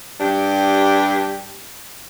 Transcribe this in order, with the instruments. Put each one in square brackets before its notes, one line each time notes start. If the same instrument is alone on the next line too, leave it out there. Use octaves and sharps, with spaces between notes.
[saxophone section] G2 D4 G4